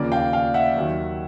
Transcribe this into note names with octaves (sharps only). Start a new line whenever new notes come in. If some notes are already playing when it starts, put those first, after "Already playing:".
Already playing: D#2 C#3 F3 A#3 D5
F5 G5
F5 G5
E5 F#5
D#2 D#3 F#3